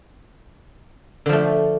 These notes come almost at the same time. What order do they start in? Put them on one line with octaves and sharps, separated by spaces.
D3 F3 A3